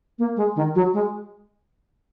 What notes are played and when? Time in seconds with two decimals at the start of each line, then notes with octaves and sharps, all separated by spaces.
0.19 A#3
0.36 G#3
0.56 D#3
0.75 F#3
0.94 G#3